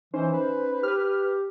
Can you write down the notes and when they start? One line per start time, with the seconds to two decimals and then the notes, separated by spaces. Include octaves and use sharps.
0.14 E3 C#4 D#4 C5
0.33 B4
0.83 G4 B4 F6